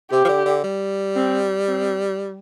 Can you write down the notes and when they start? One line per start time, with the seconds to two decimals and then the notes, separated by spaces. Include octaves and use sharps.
0.11 C3 G4
0.25 F3
0.29 D3
0.46 D3
0.64 G3
1.16 C4
1.68 C4